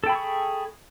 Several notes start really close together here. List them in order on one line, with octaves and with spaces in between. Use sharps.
A4 G5 B5 G#4 C#6